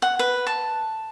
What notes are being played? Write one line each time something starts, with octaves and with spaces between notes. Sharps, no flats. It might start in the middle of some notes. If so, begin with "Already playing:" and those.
F#5
B4
A5